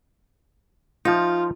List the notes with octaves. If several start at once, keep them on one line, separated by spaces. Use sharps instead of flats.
F3 D#4 F4